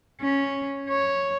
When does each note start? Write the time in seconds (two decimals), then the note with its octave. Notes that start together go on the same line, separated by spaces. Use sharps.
0.21 C#4
0.89 C#5